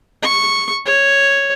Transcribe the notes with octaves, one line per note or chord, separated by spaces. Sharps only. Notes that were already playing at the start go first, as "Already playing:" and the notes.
C#6
C#5